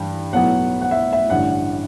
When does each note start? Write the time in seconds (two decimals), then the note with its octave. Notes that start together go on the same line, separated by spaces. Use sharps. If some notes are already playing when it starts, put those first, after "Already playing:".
Already playing: G2 E3 G5
0.33 B1 A2 F#3 B3 F#5
0.81 F#5
0.91 E5
1.13 E5
1.30 A1 G2 D3 F#5